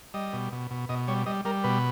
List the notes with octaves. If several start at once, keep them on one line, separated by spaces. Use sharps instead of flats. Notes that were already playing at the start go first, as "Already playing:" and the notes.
G3 D#5
B2
B2
B2
B2 D#5
G3 C#5
G3 D#5
G3 A#4
B2 B4